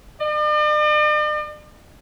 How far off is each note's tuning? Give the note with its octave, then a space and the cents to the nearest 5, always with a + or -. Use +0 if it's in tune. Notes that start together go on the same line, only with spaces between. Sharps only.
D5 +45